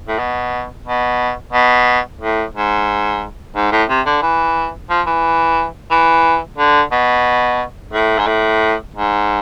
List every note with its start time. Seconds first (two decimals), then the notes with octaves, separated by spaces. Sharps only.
0.09 A2
0.19 B2
0.86 B2
1.53 B2
2.21 A2
2.54 G#2
3.56 G#2
3.72 A2
3.89 C3
4.06 D3
4.23 E3
4.90 F3
5.07 E3
5.91 E3
6.58 D3
6.92 B2
7.93 A2
8.19 G#2
8.27 A2
8.94 G#2